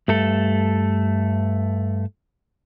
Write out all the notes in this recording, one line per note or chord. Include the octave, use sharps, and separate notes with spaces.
G2 A3 A4